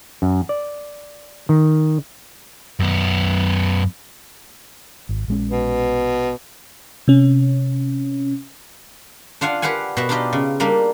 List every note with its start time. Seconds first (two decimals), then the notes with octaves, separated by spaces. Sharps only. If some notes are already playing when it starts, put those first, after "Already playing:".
0.22 F#2
0.49 D5
1.49 D#3
2.80 F#2 B3
5.09 G#1
5.28 A#1 G#3 C#4
5.50 B2
7.08 C3 C#4
9.41 D4 F4 F5 F#5 G#5
9.62 G4 B4 F5 F#5 G#5
9.97 B2 B4 E5
10.09 D4 D#4 F4 G4 D#5
10.33 C#3
10.60 G3 A#3 D4 D#4